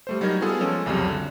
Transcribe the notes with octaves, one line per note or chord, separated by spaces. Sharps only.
G3 A3 C5
F#3 G3 D#4 A#4 G#6
G3 B3 F4 G#4 A4
F3 G#3 C#4 A4
C2 F2 C#3 F#3 G3
D3